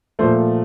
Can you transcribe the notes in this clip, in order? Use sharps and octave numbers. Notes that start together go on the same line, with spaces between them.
A#2 F3 A3 C5